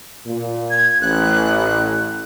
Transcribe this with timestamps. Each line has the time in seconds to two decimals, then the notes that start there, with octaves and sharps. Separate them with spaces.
0.26 A#2
0.70 G#6
1.02 A1 F#6